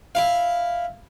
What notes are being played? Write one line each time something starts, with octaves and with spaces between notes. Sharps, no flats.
E4 F5